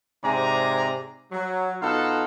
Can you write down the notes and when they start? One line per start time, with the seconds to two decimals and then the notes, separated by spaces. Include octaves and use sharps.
0.23 G#2 C3 D5 G#5 A#5
1.31 F#3
1.81 B2 D#4 F4 A4 F#5